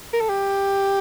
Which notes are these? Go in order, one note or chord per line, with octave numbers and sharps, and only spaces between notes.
A#4
A4
G4